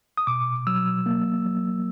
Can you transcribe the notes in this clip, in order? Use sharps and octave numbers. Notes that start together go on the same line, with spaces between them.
D#6
B2 D6
F#3 E6
A#3
F#3